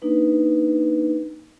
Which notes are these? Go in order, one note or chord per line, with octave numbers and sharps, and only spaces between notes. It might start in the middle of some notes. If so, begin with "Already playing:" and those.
A#3 D4 D#4 B4